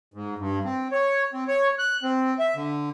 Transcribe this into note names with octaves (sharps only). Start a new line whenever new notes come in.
G#2
G2
C4
C#5
C4
C#5
F#6
C4
E5
D3